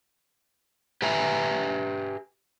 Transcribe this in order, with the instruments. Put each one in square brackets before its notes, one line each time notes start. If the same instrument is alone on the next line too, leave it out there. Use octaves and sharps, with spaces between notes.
[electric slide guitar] G4 B4 E5 G#5 A#5